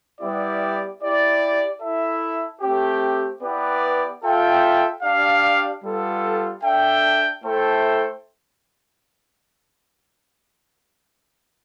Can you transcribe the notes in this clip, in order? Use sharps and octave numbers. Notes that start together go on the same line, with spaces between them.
G3 B3 E4 G4 D5
E4 G4 D5
E4 A4 E5
A3 C4 G4
B3 E4 G4 B4 D5
F4 A4 E5 G5
D4 G4 D5 F5
G3 B3 F4 A4
D4 A4 E5 G5
A3 E4 A4 C5 G5